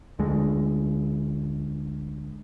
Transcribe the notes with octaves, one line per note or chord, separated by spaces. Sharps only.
D2 D3 G#3